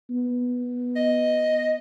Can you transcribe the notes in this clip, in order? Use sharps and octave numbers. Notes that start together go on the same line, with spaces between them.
B3
D#5